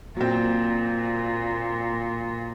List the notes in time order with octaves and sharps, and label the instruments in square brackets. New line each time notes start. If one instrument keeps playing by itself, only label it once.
[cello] A#2 [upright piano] F#3 C4 [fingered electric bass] A#3